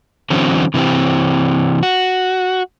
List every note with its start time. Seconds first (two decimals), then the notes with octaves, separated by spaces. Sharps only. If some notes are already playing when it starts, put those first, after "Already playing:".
0.30 D3 E3 F#3 C4 C#4
0.74 C3 E3 G#3 C4 G4
1.83 F#4